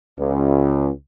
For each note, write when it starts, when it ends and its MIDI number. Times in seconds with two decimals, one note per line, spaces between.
0.19 0.90 37